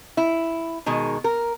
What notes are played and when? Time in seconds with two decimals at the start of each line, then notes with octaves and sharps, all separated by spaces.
0.17 E4
0.86 B2 D#3 G#3
1.24 A#4